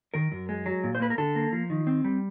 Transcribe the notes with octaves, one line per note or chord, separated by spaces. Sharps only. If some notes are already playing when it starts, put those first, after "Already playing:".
D#3 A#4
F#2
G#3
F#3
A#2
C5
A#3 B4
A#4
D3 A4
A#3
F3
D#3
C4
G3